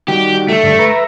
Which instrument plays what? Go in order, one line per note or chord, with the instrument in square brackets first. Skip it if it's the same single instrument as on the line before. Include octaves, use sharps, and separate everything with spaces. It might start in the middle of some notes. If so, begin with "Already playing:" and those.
[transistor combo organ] D#3 G3 F#4 [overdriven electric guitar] G4
[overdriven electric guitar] A3
[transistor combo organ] G2 D3
B4 E5 A#5